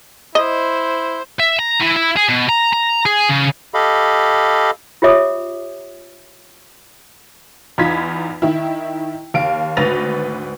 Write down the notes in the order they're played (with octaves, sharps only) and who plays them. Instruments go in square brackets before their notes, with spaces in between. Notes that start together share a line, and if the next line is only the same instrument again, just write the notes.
[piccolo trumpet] E4 [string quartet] C5 [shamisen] D#5
[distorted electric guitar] E5
A#5
E3
E4
G#4
B2
A#5
A#5
G#4
C#3
[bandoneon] G4 A4 D#5 F5 B5
[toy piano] F4 G4 C#5 E5 D6 D#6
[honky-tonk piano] E2 D#4 F4 B5 G#6 B6
D#3 E4
D#2 F5 D7
G#1 D2 B4 A6 A#6 F7